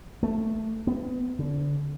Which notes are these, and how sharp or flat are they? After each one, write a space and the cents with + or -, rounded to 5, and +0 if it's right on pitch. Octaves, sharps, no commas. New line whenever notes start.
A3 +5
B3 +30
D3 -30